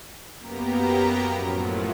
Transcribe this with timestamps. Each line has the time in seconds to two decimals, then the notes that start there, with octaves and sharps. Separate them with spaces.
0.38 F#2 A#3 B3 G4 A#5
1.35 F#2 A2 F3 F#3